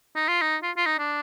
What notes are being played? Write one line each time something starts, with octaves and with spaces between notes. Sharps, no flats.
D#4
F4
D#4
F4
F4
D#4
D4